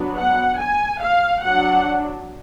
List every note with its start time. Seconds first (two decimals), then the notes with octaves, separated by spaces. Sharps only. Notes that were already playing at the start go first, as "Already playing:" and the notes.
Already playing: F#3 B3 D4
0.17 F#5
0.59 G#5
1.02 F5
1.43 F#3 D4 F#5